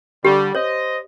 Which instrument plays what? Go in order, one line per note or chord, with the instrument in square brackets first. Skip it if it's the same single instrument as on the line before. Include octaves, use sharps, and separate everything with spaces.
[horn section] D3 G3 [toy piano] G4
[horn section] C5 D#5 [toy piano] C#5